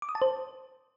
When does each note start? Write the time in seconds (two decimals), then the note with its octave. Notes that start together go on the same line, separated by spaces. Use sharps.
0.02 D6
0.09 D#6
0.15 A5
0.22 C5